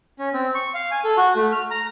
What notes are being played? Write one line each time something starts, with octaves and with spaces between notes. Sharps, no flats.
C#4
C4
C#6
F5
G#5
A4
F#4
A3
F6
A#5